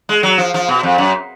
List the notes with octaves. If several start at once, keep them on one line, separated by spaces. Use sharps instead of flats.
G#3
F#3
F3
F3
B2
F2
F#2